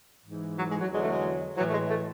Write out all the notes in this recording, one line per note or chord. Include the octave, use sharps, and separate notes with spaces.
G#2 E3
F#3
G#3
F#3
E2 D3 F#3 G#3
A3
G#3
A2 E3 F#3
A3
G#3
A3